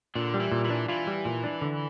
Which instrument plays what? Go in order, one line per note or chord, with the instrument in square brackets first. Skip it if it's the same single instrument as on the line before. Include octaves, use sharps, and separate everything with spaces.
[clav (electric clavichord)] A#2 [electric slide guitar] D3 D4
[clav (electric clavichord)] G3
[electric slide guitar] E3 E4
[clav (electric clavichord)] A#2
[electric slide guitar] E3 E4
[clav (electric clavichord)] D4
[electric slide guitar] E3 E4 [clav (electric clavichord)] F4
[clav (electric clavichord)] G3
A#2
D4
D3